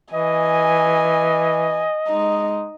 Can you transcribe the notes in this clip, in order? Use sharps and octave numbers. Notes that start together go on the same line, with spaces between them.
E3 D#5 G#5
G#3 D#4